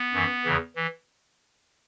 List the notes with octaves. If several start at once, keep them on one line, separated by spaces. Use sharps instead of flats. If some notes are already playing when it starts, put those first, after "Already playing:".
Already playing: B3
F#2 E3
E2 C#3 E3
E3